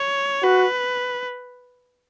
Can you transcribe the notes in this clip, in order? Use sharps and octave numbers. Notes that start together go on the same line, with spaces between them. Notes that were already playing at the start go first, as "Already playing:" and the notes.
Already playing: C#5
F#4 B4